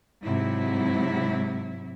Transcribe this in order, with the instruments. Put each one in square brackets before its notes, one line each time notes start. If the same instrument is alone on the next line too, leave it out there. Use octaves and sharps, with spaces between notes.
[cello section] G#2 C3 F#3 E4